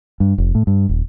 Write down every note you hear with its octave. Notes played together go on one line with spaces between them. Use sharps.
G2
F1
A2
G2
D#1